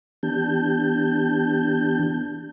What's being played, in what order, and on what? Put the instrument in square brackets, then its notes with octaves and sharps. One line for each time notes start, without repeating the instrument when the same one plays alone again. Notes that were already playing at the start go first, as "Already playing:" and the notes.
[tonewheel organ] E3 B3 D4 G4 A5 G6